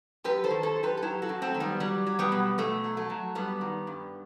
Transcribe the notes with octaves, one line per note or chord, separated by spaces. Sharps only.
F#2 G4 B4
A4 C5
D#3
A4 C5
F#2
G4 B4
A4
F#3 E4 G4
F#4 A4
F#2
A3 C4
D#3
G3 B3
F#3 G3
F#3
G3 B3
B2
B2 A3
F#3
A3
F#3
G2 G3 B3
D#3
G2